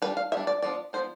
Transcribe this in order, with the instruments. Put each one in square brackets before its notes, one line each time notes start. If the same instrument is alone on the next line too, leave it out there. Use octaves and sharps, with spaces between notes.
[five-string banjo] G3 B4
D4
F5
G3 D4 E5
D5
F3 B3 D4 D5
F3 B3 D4 C5